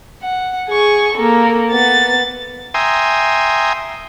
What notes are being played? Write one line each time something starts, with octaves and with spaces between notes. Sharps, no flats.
F#5
G#4 C#6
A#3 A4
B3 A6
E5 G5 G#5 A#5 C6 D#6